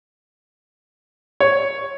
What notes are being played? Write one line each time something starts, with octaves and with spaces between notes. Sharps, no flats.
C#5